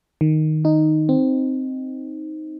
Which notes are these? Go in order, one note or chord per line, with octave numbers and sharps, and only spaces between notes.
D#3
D#4
C4